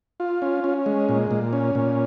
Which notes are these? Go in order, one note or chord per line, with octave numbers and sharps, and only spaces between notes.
F4
C#4
C#4
G#3
A#2
A#2
C#4
A#2